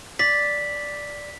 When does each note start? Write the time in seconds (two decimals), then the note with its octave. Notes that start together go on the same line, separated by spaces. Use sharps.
0.19 D5 B6